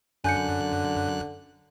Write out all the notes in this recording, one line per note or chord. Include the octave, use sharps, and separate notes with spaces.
F#2 D3 G#5 F#6 G6 C#7